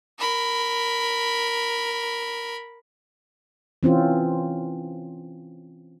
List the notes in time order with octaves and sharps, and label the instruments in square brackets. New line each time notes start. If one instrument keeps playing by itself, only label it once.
[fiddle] A#4 B5
[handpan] E3 C4 C#4 F4